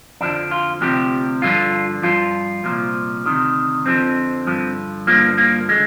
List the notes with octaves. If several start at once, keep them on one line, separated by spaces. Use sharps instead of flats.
F2 D3 F3 D4
F4
D2 C3 F3 G4
G2 D3 F3 F4
G2 F3 F4
C2 A#2 F3
D2 C3 D#3
F2 D3 F3 C4
G2 D3 F3
G2 D3 F3 A#3
A#3
D3 G#3